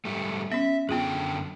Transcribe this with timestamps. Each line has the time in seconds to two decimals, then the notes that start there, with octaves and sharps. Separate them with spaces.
0.05 G#2 G3 A3
0.52 B3 C#4 E5
0.89 F#2 D3 B3 F4 G#4 G5